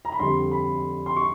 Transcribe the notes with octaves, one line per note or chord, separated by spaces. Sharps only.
A#5
B5
F2 D3 G3 C6
B5
C6
C#6